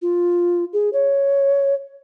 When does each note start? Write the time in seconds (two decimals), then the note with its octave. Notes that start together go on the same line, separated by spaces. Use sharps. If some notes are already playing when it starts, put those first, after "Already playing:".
0.02 F4
0.73 G#4
0.93 C#5